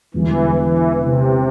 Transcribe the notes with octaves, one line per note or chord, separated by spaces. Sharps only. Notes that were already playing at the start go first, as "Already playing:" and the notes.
E1 E2 D3 E3 G3
E3
C3